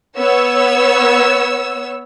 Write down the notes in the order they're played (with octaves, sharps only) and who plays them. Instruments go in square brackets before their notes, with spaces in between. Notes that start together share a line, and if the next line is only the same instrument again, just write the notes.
[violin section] B3 C#5 E6